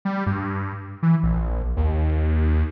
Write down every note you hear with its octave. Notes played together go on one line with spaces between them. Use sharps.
G3
G2
E3
A#1
D#2